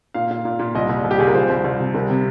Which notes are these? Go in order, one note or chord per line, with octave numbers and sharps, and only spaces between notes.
A#2 F5
A#2 F5
A#2
A#2
C2 D#5
C2
C2
G4
C2 G#4
A#4
F3 C5
C2
C2
C3
C2 A#4
C3